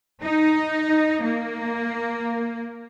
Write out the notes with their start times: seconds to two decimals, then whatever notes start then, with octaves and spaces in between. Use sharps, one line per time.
0.22 D#4
1.23 A#3